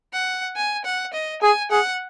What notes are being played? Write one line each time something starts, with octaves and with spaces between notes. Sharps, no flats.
F#5
G#5
F#5
D#5
G#4 G#5
G#4 F#5